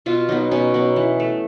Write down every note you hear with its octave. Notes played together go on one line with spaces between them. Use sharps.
B2 F4
F#3 B3 D#4
B2 C#4
F#3 B3
E3
A3